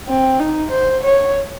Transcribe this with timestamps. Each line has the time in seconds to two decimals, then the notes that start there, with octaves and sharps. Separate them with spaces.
0.08 C4
0.39 D#4
0.71 C5
1.04 C#5